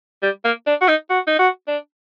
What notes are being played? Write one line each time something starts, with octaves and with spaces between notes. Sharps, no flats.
G3
A#3
D4
F#4
D#4
F#4
D#4
F#4
D4